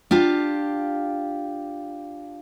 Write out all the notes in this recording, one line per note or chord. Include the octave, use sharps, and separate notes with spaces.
D4 F4 G4 F5